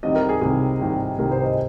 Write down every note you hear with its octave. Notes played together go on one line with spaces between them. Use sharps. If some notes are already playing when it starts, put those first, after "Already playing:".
C2 C3 D#3 D#5
A#4
G#4
C2 C3 D#3 G#4
C2 C3 D#3
C2 C3 D#3 A#4
C5
D#5